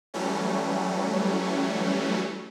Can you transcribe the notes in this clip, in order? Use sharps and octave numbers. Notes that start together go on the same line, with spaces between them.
E3 F#3 G3 A3 C#4